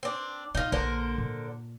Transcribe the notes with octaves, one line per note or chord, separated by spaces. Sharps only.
C4 D4
B2 D#4 F4
A#1 D3 A#3 A#4 C5
A#2